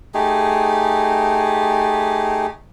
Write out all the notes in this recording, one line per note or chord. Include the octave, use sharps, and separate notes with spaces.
A3 D#4 G4 G#4